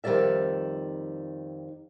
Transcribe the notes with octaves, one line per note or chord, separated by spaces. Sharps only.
F2 D#3 F#3 G3 D5 E5